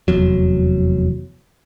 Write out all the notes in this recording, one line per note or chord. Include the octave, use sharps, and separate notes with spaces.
F1 E2 F#3